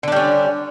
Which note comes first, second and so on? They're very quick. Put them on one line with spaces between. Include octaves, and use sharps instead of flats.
D3 D4 G3 C#4